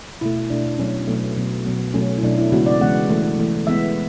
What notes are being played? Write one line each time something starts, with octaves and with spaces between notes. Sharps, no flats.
B2 A3 E4
B2 A3 D4
B2 F#3 A3 C#4
B2 F#3 A3 B3
B2 F#3 B3
B2 F#3 B3
B2 F#3 A3 C#4
E4
B2 F#3 A3 D4
E4
C#3 E3 G#3 B3 F#4
D5
C#3 E3 G#3 B3 F#5
E3 A3
E3 A3
E3 G#3 B3 E5